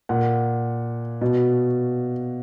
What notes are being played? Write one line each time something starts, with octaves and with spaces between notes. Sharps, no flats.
A#2 F#5
B2